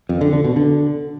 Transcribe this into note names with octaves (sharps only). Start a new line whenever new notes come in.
F2
D3
D3
B2
D3